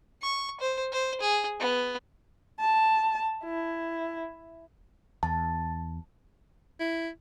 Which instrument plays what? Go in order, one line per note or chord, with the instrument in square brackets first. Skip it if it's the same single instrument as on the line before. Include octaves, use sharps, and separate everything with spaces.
[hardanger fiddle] C#6
C5
C5
G#4
B3
[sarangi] A5
E4
[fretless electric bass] E2 [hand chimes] A5
[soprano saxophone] E4